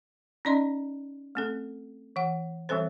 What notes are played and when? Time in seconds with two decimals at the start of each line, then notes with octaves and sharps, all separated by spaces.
0.45 C#4 D#4 D5 D#5 C6
1.35 A3 C4 A4
2.16 E3 F#5
2.69 E3 G3 C4 A4 C5